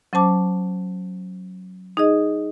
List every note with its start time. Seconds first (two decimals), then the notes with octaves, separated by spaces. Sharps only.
0.13 F#3 C#4 C5 A5 D6
1.97 D#4 G#4 D#5